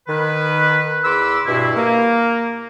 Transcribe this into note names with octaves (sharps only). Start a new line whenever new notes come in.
D#3 B4
E2 B5 C6 D6 E6
G2 B2 E4
A#3